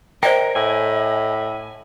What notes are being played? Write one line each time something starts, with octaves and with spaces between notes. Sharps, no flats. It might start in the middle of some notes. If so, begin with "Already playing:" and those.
A#4 C5 D5 D#5 G5
A2 G#5